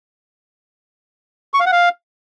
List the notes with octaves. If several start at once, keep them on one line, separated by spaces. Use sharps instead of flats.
C#6
F5
F#5
F5